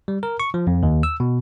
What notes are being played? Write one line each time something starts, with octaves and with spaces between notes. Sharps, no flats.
G3
A#4
C#6
F3
F2
D#2
E6
B2